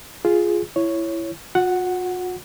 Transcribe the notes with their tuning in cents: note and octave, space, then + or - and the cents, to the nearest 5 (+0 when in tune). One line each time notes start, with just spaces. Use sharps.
F4 +0 G#4 +0
E4 +15 C#5 +0
F#4 -45 F#5 +0